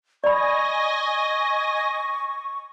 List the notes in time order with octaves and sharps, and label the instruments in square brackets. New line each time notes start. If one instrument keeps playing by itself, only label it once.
[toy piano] D5 B5 [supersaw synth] D#5 G#5 A#6 [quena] C#6